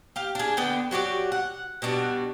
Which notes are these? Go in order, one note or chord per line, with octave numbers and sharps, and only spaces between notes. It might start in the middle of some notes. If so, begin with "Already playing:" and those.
G4 F5
D4 G#4
D3 B3 D4 G5
F#3 F#4 G4 D5
F#5
B2 G3 D4 F#4